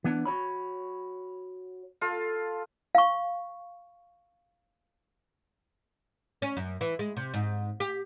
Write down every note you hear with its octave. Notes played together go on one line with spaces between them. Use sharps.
E3 B3 D4
F#4 C#5 B5
F4 A4
F5 C#6
C#4
F#2
E3
G#3
C3
G#2
G4